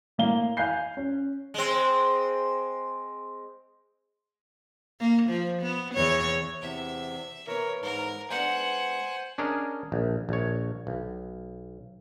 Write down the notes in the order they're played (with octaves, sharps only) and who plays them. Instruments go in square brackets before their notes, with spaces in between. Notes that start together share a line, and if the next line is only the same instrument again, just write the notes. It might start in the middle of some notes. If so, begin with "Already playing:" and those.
[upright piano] A2 A#3 F5 G7
F5 G#5 F#6 G6 C7
C#4
[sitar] G#3 C4
[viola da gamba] A#3
F3
B3
E2 C#5
[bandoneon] E2 C3 [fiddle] E5
[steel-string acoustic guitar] E3 B3 [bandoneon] A#4 [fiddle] C#5
[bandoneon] G#2 [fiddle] A#4
[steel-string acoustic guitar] G#3 B3 D4 [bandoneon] C5 G#5 [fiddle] F#5
[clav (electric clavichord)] C#4 D4 G#4 A#4 D#5
A#1
A#1 C#5
B1